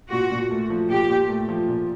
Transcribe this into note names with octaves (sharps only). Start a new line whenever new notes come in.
A#2 F#4
A#2
A3
F3
A#2 G4
A#2
A3
F3
A#2